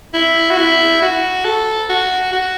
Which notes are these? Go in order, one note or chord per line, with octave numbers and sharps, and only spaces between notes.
E4
F#4
E4
F#4
A4
F#4
F#4